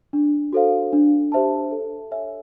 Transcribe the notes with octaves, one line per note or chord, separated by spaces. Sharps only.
D4
F#4 A4 C5 F5
D4
G4 C5 E5 A5
A4
C#5 E5 G#5